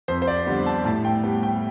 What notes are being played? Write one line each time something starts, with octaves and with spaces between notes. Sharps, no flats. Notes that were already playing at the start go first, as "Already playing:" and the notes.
F2 C5
C5
D5
D3 G3 B3
A5
A2 A5
G5
G3 B3
G5